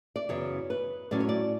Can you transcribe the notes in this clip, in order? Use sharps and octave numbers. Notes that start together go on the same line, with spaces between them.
D5
F#2 C#3 E3 B3 C#5
B4
A2 F#3 C#4 D5
C#5
D5